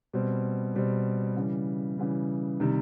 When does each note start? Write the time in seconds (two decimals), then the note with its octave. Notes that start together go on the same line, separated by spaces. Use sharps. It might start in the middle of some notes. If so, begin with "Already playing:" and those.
0.14 B2 G3 C4
0.75 B2 G3 C4
1.37 C#3 E3 G3
1.97 C#3 E3 G3
2.60 C3 D#3 G3